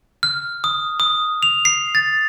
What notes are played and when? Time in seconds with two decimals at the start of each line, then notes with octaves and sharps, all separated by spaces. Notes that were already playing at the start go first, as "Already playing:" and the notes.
0.23 F6
0.64 D#6
1.00 D#6
1.43 F7
1.65 C7
1.95 A6